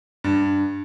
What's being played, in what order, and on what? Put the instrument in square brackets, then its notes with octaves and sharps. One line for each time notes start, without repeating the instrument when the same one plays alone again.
[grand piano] G2